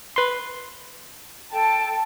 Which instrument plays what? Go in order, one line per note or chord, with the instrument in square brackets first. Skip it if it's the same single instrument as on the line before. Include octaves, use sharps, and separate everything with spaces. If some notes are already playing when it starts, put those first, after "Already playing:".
[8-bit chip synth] B4 C6
[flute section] A4 G5 [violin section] A5